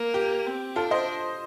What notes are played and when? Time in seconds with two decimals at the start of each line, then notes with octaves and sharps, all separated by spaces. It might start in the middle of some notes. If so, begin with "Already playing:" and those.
Already playing: A#3
0.14 G4
0.46 C4
0.76 D4 F4 A4
0.91 C5 D#5